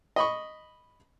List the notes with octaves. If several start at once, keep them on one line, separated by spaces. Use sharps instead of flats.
D#5 B5 C#6